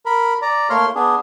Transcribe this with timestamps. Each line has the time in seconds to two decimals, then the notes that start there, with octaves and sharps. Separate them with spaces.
0.06 A#4 B5
0.42 D5 A#5
0.70 A3 A#3 C#5 C6 F6
0.95 B3 D4 G#4